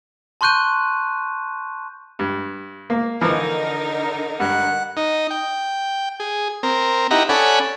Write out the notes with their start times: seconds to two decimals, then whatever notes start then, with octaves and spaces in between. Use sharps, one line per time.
0.41 A5 C6 C#6 F#6 G6 D#7
2.19 G2
2.90 A#3
3.21 D3 E3 F3 D#4 A#4
4.40 G2 F#5
4.97 D#4
5.31 G5
6.20 G#4
6.63 C4 A#4
7.11 D#4 E4 G4 F#5 A#5
7.29 C#4 A4 D5 F#5 G#5 B5